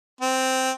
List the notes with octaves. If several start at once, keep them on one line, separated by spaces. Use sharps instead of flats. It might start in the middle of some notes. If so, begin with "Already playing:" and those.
C4